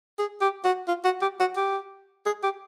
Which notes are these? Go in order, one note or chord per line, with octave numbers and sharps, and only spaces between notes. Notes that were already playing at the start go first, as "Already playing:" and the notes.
G#4
G4
F#4
F4
F#4
G4
F#4
G4
G#4
G4